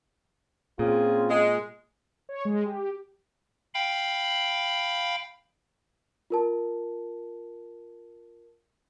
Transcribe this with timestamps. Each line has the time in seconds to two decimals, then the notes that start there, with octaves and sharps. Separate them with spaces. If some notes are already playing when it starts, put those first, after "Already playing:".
0.79 A#2 C4 C#4 F4 G#4
1.29 G#3
2.29 C#5
2.45 G#3
2.65 G4
3.74 F5 G5 B5
6.30 F4 A#4 A5